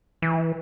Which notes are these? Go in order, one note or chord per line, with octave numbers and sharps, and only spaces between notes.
E3